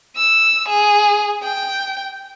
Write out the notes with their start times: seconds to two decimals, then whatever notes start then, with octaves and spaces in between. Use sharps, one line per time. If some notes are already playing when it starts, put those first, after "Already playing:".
0.16 E6
0.69 G#4
1.43 G5